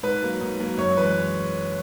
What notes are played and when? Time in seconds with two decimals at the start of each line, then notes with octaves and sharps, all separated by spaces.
0.03 G#2 B4
0.22 F#3 A#3
0.41 G#2
0.60 F#3 A#3
0.77 F#2 C#5
0.97 E3 G#3 B4